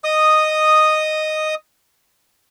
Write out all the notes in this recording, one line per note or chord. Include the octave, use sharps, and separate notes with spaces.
D#5 D#6